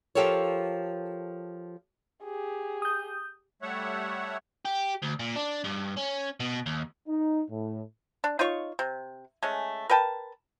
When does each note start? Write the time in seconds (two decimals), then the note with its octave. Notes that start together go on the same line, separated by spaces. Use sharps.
0.15 F3 F4 G4 A4 A#4 C#5
2.24 G4 G#4
2.82 D#6 G6
3.62 G3 A3 C#5 E5 F#5
4.65 G4
5.02 D2
5.19 A#2
5.36 D4
5.65 G2
5.98 C#4
6.40 B2
6.66 D#2
7.07 D#4
7.50 A2
8.24 D4
8.39 D#4 F4 C#5 C#6
8.79 C3
9.43 G#3 A3 C#4
9.90 A#4 B4 G5 A5